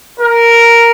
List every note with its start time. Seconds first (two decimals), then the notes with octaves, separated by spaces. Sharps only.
0.20 A#4